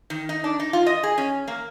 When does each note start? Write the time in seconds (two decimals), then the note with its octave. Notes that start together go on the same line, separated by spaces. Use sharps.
0.10 D#3
0.29 D#4
0.44 D4
0.60 D#4
0.73 F4
0.86 D#5
1.03 G#4
1.18 C#4
1.48 A#3